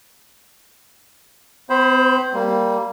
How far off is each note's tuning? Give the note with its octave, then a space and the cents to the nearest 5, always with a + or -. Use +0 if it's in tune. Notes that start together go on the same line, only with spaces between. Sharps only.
C4 -40 C5 +10 B5 +0
G3 -10 A#3 +0